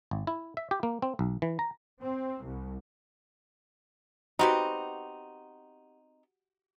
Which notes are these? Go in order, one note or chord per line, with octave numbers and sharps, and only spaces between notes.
G#1
E4
E5
G4
A#3
C4
B1
E3
A#5
C4
C2
B3 C4 D#4 F#4 G4